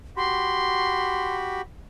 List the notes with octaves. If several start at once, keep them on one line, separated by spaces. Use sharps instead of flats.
F#4 G4 B5 C6